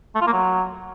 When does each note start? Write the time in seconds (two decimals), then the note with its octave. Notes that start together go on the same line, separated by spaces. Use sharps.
0.15 A3
0.21 F4
0.27 A#3
0.33 F#3